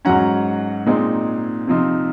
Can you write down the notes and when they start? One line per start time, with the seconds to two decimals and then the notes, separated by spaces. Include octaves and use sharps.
0.05 G#2 F#3 C#4 F#5 A#5
0.86 A#2 G#3 C4 D#4
1.68 C3 F3 C4 D#4